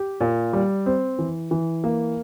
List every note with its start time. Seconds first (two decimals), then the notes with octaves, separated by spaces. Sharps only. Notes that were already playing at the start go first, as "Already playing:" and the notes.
Already playing: G4
0.21 A#2
0.53 G3
0.86 C4
1.19 E3
1.51 E3
1.84 A#3